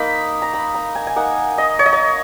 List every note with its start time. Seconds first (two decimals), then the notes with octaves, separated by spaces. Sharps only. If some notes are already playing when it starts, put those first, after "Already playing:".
Already playing: A#3 D#4 B5
0.42 A#5
0.54 B5
0.75 A#5
0.95 G#5
1.07 G#5
1.16 A#3 D#4 F#5
1.58 D#5
1.79 C#5
1.86 D#5
1.93 C#5